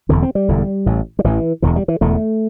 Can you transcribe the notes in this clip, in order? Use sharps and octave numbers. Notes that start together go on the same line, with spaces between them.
E1 E2 D3 C4
C4
G3
E1 E2 D3
A1 A2
G3
A1 A2 E3
E1 E2 D3 E3
G3
E3
E1 E2 D3 A3